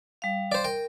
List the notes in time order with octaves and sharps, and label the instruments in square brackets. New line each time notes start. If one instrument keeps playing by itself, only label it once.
[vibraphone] G3 F5
[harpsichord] C5 D5
[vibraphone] A#4 [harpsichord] G5